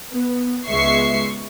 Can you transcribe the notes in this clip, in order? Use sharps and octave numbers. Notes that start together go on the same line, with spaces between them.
B3
C#2 G#3 B3 E5 C#6 C7